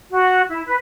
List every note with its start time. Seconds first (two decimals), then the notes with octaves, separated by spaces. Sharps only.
0.11 F#4
0.50 E4
0.66 B4